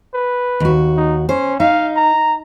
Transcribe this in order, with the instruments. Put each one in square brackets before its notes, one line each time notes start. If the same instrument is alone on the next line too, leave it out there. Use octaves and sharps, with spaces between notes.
[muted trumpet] B4
[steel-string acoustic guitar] D#2 F#4
[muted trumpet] D#4
[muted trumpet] C#4 [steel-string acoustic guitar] C5
[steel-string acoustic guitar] D#4 [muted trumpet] F5
[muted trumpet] A#5